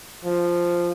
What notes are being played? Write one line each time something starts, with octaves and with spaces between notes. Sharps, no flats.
F3